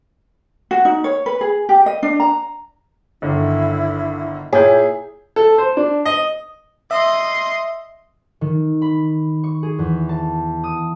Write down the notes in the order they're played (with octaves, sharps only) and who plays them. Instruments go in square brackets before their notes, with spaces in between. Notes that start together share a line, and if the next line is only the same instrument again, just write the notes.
[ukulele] F#4
D#4
C#5
B4
G#4
G4
D#5
D4
A#5
[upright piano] G1 D3 D#3 [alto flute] E4
[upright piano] A#2 E4 G6 [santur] G#4 [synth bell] C#5 [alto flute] G5
[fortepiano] A4
C5
D4
D#5
[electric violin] D#5 C6 [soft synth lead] E5
[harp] D#3
B5
C#6
G#4
E2
A5
D#6